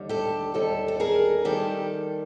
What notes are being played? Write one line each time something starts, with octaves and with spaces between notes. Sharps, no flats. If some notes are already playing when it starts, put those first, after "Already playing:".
Already playing: D#2 D3 G3
G4 A4
D#2 D3 G3 G4 A4
A4
G#4 A#4
D#3 G3 G4 A4